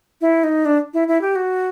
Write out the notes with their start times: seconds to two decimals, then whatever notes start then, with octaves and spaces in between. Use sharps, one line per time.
0.21 E4
0.44 D#4
0.65 D4
0.94 E4
1.08 E4
1.21 G4
1.36 F#4